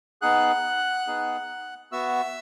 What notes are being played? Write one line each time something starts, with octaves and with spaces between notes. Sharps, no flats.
B3 D#4 G#4 F#5 F#6
B3 D#4 G#4
B3 F#4 E5 E6